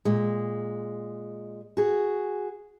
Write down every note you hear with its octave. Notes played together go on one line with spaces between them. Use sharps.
A#2 G#3
F#4 G#4